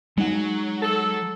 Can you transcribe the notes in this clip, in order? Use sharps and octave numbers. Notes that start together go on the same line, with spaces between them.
F#3 G#3 D#4 F#5
A4